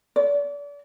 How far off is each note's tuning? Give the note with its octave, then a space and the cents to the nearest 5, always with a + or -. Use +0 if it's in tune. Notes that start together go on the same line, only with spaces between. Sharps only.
D5 -35